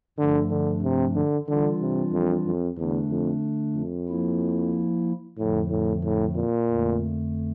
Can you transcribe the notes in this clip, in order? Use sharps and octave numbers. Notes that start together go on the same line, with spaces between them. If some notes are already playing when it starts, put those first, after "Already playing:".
G2 D3 F3 A3 D4
D3
C3
D3
D3 E3 G3 D4 F4
C3
F2
F2
E2 D3 A3 D4
F2
F2
F3 A#3 E4
F2 A2 D3 F3
A2
A2
A#2
F2 D3 A3